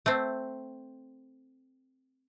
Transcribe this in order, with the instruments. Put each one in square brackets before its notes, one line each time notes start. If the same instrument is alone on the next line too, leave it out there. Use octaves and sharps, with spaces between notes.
[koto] A3 C4